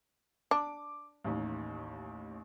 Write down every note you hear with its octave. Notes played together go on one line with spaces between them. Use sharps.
D4 D6
A1 D#2